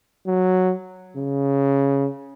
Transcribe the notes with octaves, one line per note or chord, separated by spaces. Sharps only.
F#3
C#3